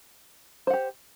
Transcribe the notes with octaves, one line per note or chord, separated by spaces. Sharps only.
G4 C5 F#5